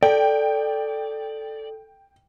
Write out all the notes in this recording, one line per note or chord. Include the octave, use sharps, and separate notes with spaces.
A4 D5 G5